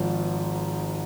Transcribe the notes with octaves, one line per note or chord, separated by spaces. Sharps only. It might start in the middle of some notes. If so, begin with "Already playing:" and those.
Already playing: G#1 G#2 F3